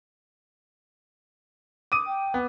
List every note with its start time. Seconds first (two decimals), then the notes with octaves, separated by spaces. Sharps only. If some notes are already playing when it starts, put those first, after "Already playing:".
1.92 D6 D#6 D#7
2.07 G5
2.34 B3